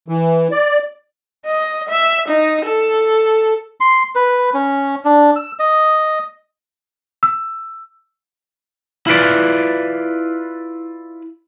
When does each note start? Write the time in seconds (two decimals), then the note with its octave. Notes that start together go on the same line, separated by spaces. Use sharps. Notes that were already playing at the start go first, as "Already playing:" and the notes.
0.08 E3
0.51 D5
1.46 D#5
1.89 E5
2.28 D#4
2.65 A4
3.80 C6
4.15 B4
4.54 C#4
5.05 D4
5.36 E6
5.59 D#5
7.23 E6
9.07 E4 F4 B4 D5